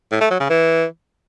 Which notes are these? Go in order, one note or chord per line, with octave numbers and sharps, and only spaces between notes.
A2
A3
F#3
C#3
E3